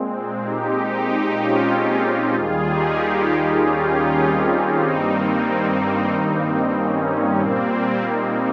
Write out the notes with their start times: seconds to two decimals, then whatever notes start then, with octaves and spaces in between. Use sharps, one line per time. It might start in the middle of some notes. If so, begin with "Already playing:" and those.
Already playing: A#2 G#3 C4
0.44 D#4 G4
1.08 D#4 G4
1.39 C#4 F4
1.71 C4 D#4
2.03 C#4
2.34 D#2 D#3 G3 F4 G#4
2.66 D#4 G4
3.61 C#4 F4
4.25 C4 D#4
4.87 G2 D#3 G3 A#3 C4 D#4
5.51 C4 D#4
6.14 C4
6.78 C#4
7.10 C#4
7.41 A#2 G3 A#3 C4
8.05 C4 D#4